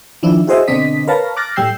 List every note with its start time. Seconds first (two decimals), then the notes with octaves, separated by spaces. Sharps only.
0.23 D#3 F3 D4 E4
0.47 E4 F#4 G#4 C5 D#5 E5
0.68 B2 D3 C4 D4 D#5 B6
1.07 A#4 B4 C#5 F5 A5 A#5
1.37 D6 F6 F#6 A6 A#6
1.56 A2 G3 G5 E6 G6 C7